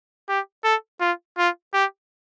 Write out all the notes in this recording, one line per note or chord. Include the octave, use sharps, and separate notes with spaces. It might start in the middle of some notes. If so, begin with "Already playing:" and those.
G4
A4
F4
F4
G4